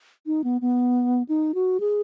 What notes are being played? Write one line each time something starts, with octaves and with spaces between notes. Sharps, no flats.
D#4
B3
B3
D#4
F#4
G#4